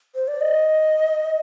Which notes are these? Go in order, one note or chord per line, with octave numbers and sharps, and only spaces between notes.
C5
D5
D#5